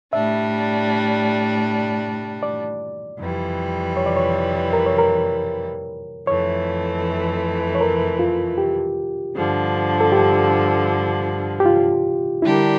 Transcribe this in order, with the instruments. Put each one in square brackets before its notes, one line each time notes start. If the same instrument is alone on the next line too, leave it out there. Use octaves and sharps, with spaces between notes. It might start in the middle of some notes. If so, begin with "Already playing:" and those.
[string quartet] A2 G3 D4 [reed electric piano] E5
[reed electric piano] D5
[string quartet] F2 E3 G3
[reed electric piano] C#5
D5
C#5
A#4
C#5
A#4
[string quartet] F2 E3 A3 [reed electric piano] C#5
[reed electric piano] C#5
A#4
F4
G4
[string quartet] G2 D3 F3
[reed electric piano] A4
G4
G4
F4
[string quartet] D3 G3 D4 G4 A#4 [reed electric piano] E4